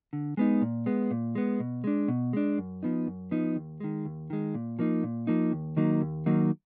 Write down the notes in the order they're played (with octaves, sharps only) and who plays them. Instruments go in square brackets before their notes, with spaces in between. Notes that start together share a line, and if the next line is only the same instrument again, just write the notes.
[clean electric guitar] D3
G#3 B3 D#4
A#2
G#3 B3
A#2
G#3 B3
B2
G#3 D4
B2
G#3 D4
F#2
F3 B3 D#4
F#2
F3 B3 D#4
D#2
D#3 G#3
D#2
D#3 G#3
A#2
F3 A#3 D#4
A#2
F3 A#3 D#4
D#2
D#3 F#3 A#3 D#4
D#2
D#3 F#3 A#3 D#4